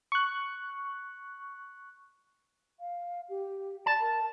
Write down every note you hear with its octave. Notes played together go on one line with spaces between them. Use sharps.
C#6 F#6
F5
G4
D5 A5
A#4